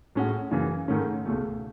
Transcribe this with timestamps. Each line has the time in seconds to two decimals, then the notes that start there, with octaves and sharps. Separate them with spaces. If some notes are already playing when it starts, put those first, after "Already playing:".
0.15 A2 G#3 C#4 F#4
0.51 F#2 C#3 E3
0.88 G#2 D#3 A3 C#4
1.25 C#2 B2 A3